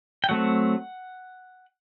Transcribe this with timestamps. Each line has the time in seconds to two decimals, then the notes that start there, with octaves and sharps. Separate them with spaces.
0.24 G5
0.29 F#3 A3 C4 F#5